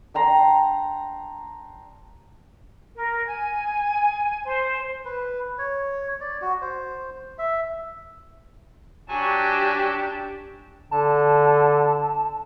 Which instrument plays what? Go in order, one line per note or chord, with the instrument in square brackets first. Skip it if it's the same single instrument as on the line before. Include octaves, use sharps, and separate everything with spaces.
[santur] D4 G5 A#5 C6
[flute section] A#4
G#5
C5
[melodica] B4
C#5
D5
F#4
C5
E5
[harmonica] F#3 F#4 G#5 [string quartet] D4 G4 A5
[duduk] D3 [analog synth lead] A5